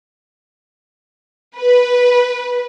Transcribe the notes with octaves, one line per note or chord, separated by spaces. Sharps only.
B4